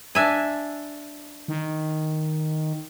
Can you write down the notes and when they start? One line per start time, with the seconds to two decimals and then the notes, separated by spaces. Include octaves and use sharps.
0.15 D4 E5 G#5
1.48 D#3